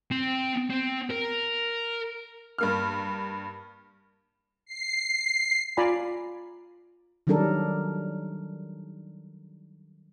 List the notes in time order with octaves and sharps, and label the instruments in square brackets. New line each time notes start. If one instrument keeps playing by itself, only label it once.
[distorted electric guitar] C4 G5
C4
A#4
[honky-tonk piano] G2 A#3 F6
[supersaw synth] C7
[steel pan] F4 D5 G#5 A#5 B5
[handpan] D#3 F#3 G3 D4 A4 A#4